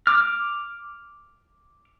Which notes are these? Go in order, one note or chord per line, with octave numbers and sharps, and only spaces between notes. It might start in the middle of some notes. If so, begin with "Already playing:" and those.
D6 F6